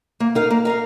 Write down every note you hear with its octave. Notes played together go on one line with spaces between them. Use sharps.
A#3
D#4 A#4 F5
A#3
D#4 A#4 F5